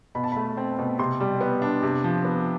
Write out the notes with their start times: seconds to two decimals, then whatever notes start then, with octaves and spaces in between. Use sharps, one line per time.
0.15 B2 B5
0.24 A5
0.32 A3 B5
0.57 C4
0.79 B2
0.99 C3 C6
1.21 G3
1.41 B3
1.62 D4
1.83 C3
2.04 F3
2.25 B3